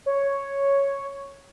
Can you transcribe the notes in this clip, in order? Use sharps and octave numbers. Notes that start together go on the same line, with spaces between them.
C#5